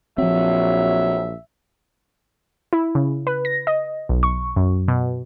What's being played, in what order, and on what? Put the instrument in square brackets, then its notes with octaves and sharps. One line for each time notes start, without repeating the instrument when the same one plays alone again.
[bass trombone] A#1 [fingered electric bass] F3 C4 [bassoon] F#3 [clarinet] E5
[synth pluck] E4
C#3
B4
A#6
D#5
B1
C#6
F#2
B2